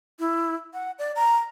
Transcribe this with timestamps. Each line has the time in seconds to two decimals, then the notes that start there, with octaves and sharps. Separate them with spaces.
0.19 E4
0.74 F#5
0.99 D5
1.16 A#5